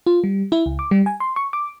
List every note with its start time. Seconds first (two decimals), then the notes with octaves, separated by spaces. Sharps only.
0.06 F4
0.24 G3
0.52 E4
0.66 C#2
0.79 D6
0.91 G3
1.06 G#5
1.20 C6
1.36 C#6
1.53 D6